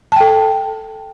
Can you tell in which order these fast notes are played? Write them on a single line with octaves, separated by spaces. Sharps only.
A5 G5 A4